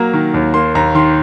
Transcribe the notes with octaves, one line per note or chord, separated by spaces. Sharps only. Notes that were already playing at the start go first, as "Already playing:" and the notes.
Already playing: F#3 A#3 A#5
D#3
D#2
A#3 C6
D#2 A#5
D#3 C6